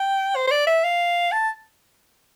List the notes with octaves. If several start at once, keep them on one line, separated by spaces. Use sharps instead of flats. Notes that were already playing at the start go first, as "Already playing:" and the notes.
Already playing: G5
C5
C5
D5
E5
F5
A5